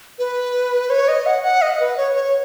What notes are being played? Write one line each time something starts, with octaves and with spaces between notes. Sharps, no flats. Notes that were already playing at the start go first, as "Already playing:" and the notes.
B4
C#5
D#5
F#5
F#5
D#5
B4
C#5
C#5